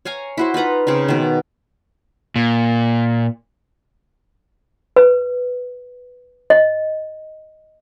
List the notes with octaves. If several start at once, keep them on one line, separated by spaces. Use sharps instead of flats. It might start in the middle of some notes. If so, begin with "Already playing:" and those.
C#5 F5 G#5 A#5
E4 F#4 C5
D#4 F4 B4 A#5
C#3 C4 D#4
B2 D#3
A#2
B4
D#5